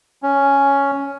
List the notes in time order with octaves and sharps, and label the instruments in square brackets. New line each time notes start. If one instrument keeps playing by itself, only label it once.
[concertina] C#4